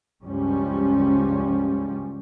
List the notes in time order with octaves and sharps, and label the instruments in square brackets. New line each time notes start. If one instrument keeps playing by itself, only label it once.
[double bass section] C#2 G2 F3 G3 C#4